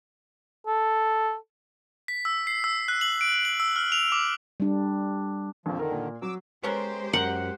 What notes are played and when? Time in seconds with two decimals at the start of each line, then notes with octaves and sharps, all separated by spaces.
0.67 A4
2.08 B6
2.25 E6
2.47 C7
2.64 E6
2.88 F#6
3.01 F#7
3.21 D7
3.45 F#7
3.60 E6
3.76 F6
3.92 F7
4.12 D6
4.60 G3 D4
5.66 A#1 F2 F3
5.79 D3 D#3 A#4
5.91 A#2
6.22 F#3 D6 E6
6.63 G#3 B3 C#4 G4 A#4 C5
7.13 F#2 A#4 F#5 G5